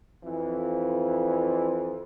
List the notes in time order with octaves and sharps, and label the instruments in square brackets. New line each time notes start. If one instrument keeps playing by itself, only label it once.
[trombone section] F2 E3